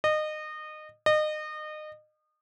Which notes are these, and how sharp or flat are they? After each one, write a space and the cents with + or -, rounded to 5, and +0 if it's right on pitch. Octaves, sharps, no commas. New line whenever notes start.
D#5 -25
D#5 -30